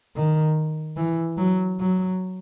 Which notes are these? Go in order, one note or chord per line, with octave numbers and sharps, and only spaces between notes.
D#3
E3
F#3
F#3